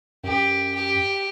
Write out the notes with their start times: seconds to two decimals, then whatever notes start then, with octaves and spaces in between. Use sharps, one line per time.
0.24 F#2 G4
0.75 G4